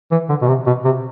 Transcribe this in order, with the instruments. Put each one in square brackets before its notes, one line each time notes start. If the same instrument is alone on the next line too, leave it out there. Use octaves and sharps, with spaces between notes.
[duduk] E3
D3
B2
C3
B2
C3